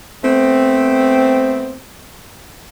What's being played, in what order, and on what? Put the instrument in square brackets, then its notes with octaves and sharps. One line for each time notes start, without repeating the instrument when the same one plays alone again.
[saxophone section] A3 B3 C4